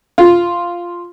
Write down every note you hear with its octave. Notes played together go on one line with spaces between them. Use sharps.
F4